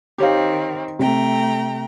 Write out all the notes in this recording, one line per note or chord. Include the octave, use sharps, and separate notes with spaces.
D#3 C4 G4 C#5 F5
C3 A3 G5 A#5